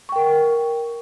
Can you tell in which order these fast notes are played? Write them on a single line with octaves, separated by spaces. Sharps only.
C#6 G5 A#4 F#5